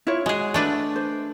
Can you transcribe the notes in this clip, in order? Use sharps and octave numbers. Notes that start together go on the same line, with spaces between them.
E4 F4 C#5
G#3 F#4 G#4
A3 D4 B4
C5